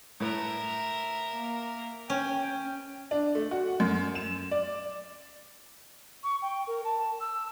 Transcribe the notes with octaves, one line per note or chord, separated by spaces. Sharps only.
A2 A3 A#4 B4 E5
A#3
C#4 G5
D4
A3
F#4
F#2
E7
D5
C#6
G5
A#4
A5
E6